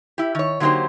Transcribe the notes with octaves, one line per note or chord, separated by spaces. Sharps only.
E4 G4
D#3 C#5
D3 F#3 A#3 D#4 G4 C5